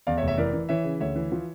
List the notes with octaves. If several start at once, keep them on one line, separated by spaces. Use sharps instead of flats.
E2 D5 F5
C#5 E5
F1
C#5 E5
E3 A#4 D5
E3
E3 C#5 E5
C#3
D2 C#5 E5
E3
F3